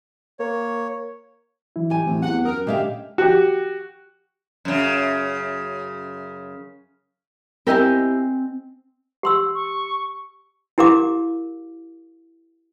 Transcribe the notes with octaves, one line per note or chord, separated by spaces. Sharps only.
A#3 C#5
E3 F#3 E4
G4 G#5
A2 E3 F#3 C4
E2 F#5
F#2 A#4 D#6
A#2 D3 G#3 G4 E5 F5
F#4 G4
F#2 C#3
C4 E4 G4 A#4 D#5 G#5
G4 C6 E6
C#6
E4 G4 A#4 F5 D6